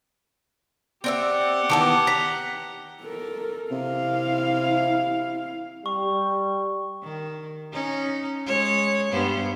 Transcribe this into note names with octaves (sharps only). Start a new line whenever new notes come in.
C4 G4 D5 E5 F#5
D#3 E3 B3 A5 D6
A#5 B6
A4 A#4
C3 E4 F5
G3 C#6
D#3
C#4 D#4
G#3 C#5
G2 B3 C5